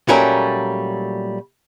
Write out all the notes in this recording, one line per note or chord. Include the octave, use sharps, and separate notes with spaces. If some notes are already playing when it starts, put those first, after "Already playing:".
A#2 F#3 G3 A3 C#4 A#4